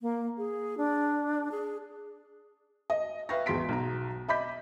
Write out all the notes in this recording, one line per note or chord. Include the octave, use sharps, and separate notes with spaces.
A#3
G#4
D4
G#4
D#5
B4 E5 F5 G5 C#6 A#6
G#1 E2 G#4 C6 B6 D7
B1 A#5
D#5 E5 B5 D6 G6 B6